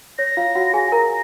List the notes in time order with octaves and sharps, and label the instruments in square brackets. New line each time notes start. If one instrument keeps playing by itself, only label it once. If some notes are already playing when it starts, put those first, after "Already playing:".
[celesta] C#5 [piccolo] A#6
[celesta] F4 F5
F#4 F#5
G#4 G#5
G#5
[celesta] A#4 A#5 [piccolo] A#6